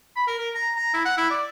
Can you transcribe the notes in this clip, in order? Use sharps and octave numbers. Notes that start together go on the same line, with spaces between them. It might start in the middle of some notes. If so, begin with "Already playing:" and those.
B5
A#4
A#4
A#5
A#5
E4
F#5
E4
D5